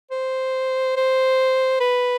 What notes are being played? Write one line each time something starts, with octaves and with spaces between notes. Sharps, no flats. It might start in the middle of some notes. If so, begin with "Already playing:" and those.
C5
C5
B4